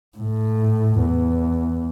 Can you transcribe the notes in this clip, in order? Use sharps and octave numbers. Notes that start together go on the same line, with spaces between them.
A2
E2